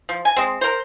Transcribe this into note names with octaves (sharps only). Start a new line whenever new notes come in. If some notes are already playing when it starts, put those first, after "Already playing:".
F3
G#5
G#3 C4
A#4 C5